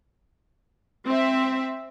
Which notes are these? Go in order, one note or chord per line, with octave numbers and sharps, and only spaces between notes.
C4 E5